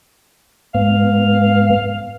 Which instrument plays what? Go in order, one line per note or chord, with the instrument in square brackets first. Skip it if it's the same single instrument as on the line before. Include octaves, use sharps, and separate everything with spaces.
[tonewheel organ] G#2 B3 [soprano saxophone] F5